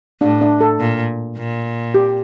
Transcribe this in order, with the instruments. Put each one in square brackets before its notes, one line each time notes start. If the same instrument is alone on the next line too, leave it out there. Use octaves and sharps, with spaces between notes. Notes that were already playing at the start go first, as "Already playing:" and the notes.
[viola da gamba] A2 [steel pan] D4
[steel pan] D4
A4
[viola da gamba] A#2
A#2
[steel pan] G4